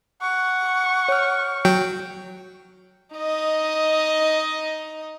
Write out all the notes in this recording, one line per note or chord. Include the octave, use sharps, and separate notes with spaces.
F#5 C#6
C#5 F6
F#3 G5
D#4 D#5